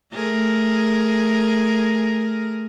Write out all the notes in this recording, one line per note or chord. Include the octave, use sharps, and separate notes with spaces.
A3 G#4 A#4